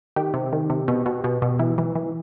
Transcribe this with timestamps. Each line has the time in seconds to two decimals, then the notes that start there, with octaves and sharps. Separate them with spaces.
0.16 D#3 G4
0.34 C3
0.53 D#3
0.70 C3
0.88 B2
1.06 B2
1.24 B2
1.42 B2
1.59 E3
1.78 E3
1.95 E3